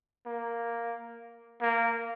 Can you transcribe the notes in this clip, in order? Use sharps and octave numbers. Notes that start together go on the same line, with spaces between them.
A#3
A#3